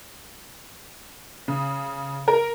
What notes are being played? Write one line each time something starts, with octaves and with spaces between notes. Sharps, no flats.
C#3
A#4